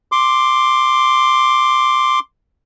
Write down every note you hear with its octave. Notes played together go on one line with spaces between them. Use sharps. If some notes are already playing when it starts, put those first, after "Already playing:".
C6 D6